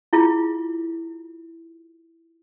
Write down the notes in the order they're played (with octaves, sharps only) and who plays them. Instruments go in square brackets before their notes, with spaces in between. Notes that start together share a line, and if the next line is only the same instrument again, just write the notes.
[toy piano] E4 F4 G#4